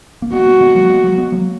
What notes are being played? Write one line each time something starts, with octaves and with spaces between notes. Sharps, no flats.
A#3
G#3 B3 F#4
G#3 B3
G#3 B3
F#3 A#3
G#3 B3
F#3 A#3
G#3 B3
F#3 A#3